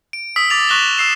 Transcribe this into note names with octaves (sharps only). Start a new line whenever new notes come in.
D7
D#6 E6 B6
D6 A6 F7
C#6 F#6 A#6 B6 E7 G7
E6 C7 E7